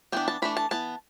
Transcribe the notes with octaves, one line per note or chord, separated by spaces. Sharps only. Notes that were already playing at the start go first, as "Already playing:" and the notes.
E3 B3 D4 G5
A5
E3 A3 D4 B5
A5
E3 B3 A5